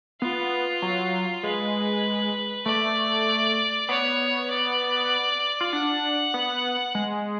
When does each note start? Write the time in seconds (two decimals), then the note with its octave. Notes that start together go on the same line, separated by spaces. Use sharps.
0.21 B3 F4
0.82 F#3
1.43 G#3 B4
2.66 A3 D5
3.89 B3 C#5
4.51 D5
5.61 F4
5.73 D4 F#5
6.34 B3
6.95 G#3